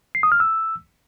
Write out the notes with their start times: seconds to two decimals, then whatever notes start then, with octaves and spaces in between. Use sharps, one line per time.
0.15 C7
0.23 D#6
0.32 F6
0.40 E6